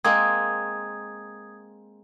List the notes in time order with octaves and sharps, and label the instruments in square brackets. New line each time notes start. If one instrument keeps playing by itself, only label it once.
[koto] G#3 A#3 C4 [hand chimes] D#6 G#6